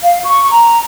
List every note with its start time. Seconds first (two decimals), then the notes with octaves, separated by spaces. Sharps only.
0.04 F5
0.25 C#6
0.52 A#5